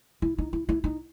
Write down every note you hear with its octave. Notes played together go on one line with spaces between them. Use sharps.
E4
D#4
E4
E4
D#4